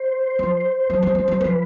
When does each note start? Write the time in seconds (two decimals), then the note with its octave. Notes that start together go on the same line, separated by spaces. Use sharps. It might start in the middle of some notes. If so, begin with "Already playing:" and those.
Already playing: C5
0.39 F3
0.90 F#3
1.02 G3
1.15 G#3
1.28 G3
1.40 F3 B4